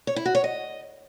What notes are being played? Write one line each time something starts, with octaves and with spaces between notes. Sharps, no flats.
C#5
E4
F#4
C#5
D#5